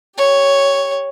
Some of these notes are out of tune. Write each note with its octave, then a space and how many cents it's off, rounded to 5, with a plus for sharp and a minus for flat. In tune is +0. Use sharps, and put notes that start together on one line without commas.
G4 +15 C#5 +0